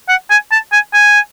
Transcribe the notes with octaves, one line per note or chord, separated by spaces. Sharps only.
F#5
G#5
A5
G#5
G#5